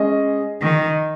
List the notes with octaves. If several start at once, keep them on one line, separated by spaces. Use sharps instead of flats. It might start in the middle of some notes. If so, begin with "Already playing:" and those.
Already playing: G#3 C#4 G#4 D#5
D#3